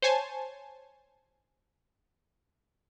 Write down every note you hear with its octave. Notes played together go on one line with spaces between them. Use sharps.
C5 C#5 G#5 A5